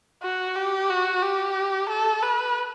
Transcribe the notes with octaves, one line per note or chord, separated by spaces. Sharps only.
F#4
G4
F#4
G4
A4
B4